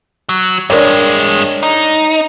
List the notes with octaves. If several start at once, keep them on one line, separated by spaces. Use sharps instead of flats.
F#3
G2 G#3 D4 A#4 C#5
D#4